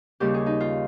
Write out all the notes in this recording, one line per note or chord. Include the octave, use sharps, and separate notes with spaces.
D#2 C#3 G3 G4
G#4
D#4
F4